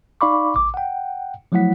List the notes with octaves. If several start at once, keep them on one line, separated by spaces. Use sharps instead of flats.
D#4 D5 F5 B5 C#6 D6
A1 D6
F#5 G5
F3 F#3 A3 E4 F#5 B6